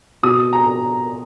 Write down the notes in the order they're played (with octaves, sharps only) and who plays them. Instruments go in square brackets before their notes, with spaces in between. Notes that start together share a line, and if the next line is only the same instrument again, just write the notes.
[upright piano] B2 D#6
A#5